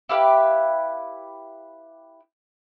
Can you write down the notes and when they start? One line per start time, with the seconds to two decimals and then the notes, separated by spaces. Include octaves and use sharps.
0.09 E4 G4 B4 F5